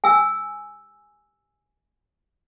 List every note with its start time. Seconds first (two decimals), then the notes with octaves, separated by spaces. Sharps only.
0.04 G#5 E6